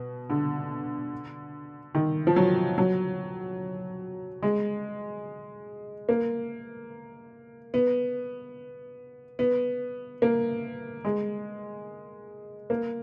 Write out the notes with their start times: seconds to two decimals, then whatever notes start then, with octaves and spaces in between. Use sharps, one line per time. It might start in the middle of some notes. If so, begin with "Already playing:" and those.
Already playing: B2
0.30 D3
1.95 D#3
2.27 F3
2.36 F#3
2.78 F#3
4.43 G#3
6.09 A#3
7.74 B3
9.39 B3
10.22 A#3
11.05 G#3
12.70 A#3